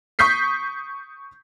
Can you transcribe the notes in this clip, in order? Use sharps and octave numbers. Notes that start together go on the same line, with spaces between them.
C#6 D#6 G6 B6 C7